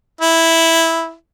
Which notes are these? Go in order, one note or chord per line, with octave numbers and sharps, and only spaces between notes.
E4